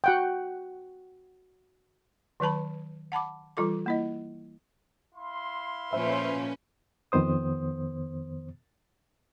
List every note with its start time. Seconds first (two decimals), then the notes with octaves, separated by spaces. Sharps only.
0.04 F#4 F#5 G5
2.40 D#3 F#3 B4 A5 B5
3.12 F#5 A5 B5 D6
3.57 E3 G3 F4 A4 D6
3.86 A#3 E4 D#5
5.15 E4 F5 C6
5.93 A#2 F3 A3 C#4 B4 C5 E5
7.12 F2 D#3 B3 C5 D#6